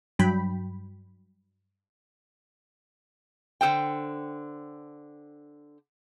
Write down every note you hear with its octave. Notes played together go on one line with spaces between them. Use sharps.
G2 F#3 G5 B5
D3 A4 C5 G5